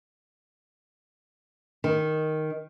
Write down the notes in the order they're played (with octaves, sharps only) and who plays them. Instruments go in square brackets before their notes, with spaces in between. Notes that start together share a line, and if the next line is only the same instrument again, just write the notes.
[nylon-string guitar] D#3